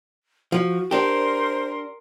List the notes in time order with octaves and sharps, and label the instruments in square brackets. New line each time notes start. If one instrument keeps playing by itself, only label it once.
[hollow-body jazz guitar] F3 [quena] F#4
[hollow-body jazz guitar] D4 G4 [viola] A#4 C6 [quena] C5